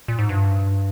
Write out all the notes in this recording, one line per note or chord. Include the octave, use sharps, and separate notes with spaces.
A#2
G#2
G2